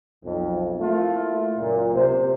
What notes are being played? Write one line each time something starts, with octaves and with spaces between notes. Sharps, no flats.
B1 F2
A3 A#3 E4 F4
C#2 F#2 A#2
C3 C5